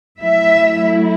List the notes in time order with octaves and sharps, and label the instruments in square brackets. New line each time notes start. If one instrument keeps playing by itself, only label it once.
[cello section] F#3 A3 E4 E5